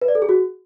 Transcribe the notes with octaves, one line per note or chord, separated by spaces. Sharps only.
B4
D5
A4
G#4
F#4